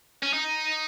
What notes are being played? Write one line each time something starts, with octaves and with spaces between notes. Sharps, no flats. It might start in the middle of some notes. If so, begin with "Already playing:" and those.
C#4
D#4